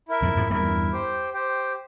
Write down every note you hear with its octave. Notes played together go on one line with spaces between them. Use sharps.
E4 A#4 E5
F2 G#2
F2 G#2
E2 G2 E4 A#4 E5
G4 C5 G5
G4 C5 G5